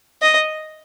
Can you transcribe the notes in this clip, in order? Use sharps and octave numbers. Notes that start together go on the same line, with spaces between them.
D#5